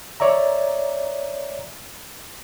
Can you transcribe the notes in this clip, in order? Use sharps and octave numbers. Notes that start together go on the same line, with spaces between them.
C#5 D5 E5 A#5